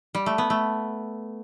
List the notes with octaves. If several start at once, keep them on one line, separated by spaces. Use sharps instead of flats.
G3
A3
B3
A3